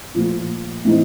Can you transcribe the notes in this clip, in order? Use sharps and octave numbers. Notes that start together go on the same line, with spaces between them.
A#2 F3 A3
A2 E3 G#3 C4 D#4